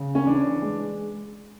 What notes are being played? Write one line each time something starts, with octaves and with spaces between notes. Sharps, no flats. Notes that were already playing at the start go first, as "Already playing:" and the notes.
Already playing: C#3
C#4
E3 D4
G#3